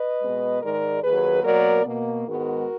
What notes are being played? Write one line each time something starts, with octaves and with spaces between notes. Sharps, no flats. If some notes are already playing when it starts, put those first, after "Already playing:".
Already playing: B4 D#5
B2 G#3 B3
G#2 D#3 G#3 A#4 D5
D#2 D#3 F#3 G#4 B4
B2 F#3 A#3 A#4 D5
B2 A#3
G#2 D#3 G#3 B3 F#4 A#4